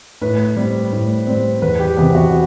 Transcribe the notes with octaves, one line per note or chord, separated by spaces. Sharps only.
A2 B4
G3 C4
A2
G3 C4
E2 B4
G4
C3 E3 B3
F#4